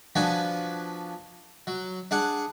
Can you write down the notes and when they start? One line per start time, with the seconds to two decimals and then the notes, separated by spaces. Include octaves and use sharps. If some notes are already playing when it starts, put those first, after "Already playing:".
0.16 F3 B3 D4 F#4 G#5
1.67 F#3
2.11 D4 G#4 F#5